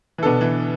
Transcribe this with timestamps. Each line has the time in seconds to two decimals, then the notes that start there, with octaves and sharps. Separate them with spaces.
0.18 E3
0.23 B2 D3 B3 D4 A4
0.41 E3